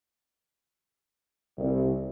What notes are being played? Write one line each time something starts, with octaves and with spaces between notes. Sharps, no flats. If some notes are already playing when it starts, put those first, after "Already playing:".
C2